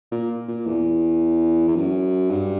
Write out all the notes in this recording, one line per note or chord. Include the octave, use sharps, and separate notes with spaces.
A#2
A#2
E2
E2
F#2
G2